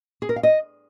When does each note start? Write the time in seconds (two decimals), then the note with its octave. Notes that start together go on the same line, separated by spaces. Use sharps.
0.22 G#4
0.29 A#4
0.36 F5
0.43 D#5